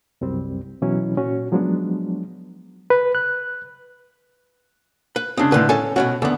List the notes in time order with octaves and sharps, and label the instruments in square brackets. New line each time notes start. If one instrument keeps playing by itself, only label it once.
[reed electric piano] C2 F#2 G3 C4
B2 E3 F#3 C#4 E4
A#2 C#4 F#4
F3 F#3 G#3 B3 D4
B4
F#6
[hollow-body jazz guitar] B4
[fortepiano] C#3 D#6 [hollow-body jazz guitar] C4 D4
[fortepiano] A2 D3 [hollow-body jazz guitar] B4 C6
[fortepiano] C#4 [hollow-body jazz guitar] A4 G#5
[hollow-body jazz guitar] B2 D#3 F#4 [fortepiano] C#4
[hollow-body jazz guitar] E2 B3 [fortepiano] D3